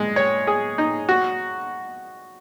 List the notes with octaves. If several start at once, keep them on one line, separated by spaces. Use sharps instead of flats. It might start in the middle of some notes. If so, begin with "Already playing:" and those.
Already playing: G#3
C#5
G#4
D#4
F#4